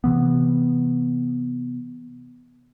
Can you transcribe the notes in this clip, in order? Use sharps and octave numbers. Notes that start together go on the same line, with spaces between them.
C3 E3 B3